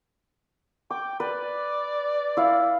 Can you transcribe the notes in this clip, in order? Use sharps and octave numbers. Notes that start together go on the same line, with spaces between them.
G5 D6
B4 D5
E4 F5